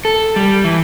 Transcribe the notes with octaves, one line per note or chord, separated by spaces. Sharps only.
A4
G3
E3